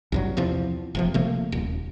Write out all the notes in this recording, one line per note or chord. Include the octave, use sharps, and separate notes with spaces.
C2 G2 F#3
E2 C3 F3
F1 C3 F3
C3 F3 A3 A#3
D#1